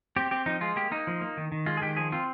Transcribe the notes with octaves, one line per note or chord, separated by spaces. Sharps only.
C4 G4
C4 G4
F3 D#4
G#3 F4
A#3 G4
A#3 D#4
F3
A#3
D#3
D#3
G#3 F4
G#4
D#3 G4
F3 G#4
C4 F4